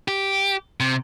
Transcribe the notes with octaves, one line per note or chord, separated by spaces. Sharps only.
G4
C3